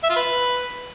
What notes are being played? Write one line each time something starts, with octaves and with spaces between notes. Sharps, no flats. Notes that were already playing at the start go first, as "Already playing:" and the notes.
E5
F4
B4